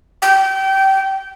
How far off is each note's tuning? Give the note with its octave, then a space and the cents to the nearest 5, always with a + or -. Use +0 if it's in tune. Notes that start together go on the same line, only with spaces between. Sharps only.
G5 -25